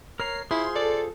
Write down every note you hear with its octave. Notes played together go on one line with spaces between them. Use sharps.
A#4 C#5 A#5 C7
E4 F4 G#4 C5 C6
A4 D5